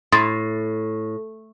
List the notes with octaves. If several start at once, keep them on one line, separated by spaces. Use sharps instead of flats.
A2 C6 D#6 A6